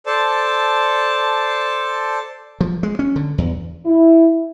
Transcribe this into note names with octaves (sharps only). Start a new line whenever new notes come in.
A4 C5 D5 A5
F3
G#3
C#4
D3
E2
E4